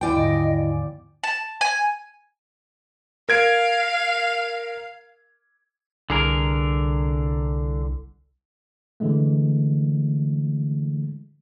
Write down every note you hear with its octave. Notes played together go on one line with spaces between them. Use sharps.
D#2 E4 D5 G5 G#5
G#2 D3 D#5
A5
G#5
A#4 F5 G#6 D7
C2 D3 G#4 A#4
D3 E3 G#3 A3